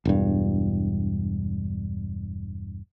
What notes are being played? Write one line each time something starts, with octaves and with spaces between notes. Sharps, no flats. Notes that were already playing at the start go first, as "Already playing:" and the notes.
E1 G2